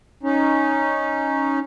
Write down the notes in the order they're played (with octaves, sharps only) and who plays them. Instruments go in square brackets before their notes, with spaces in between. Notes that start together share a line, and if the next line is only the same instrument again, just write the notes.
[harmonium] C#4 D#4